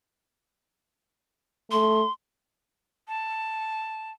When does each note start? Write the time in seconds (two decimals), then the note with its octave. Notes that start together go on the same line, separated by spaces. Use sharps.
1.71 A3 C6
3.07 A5